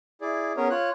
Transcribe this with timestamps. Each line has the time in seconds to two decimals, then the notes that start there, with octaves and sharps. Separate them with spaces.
0.21 E4 G#4 D5
0.57 B3 C#4 G#4 A#4 C#5
0.70 F4 C#5 F#6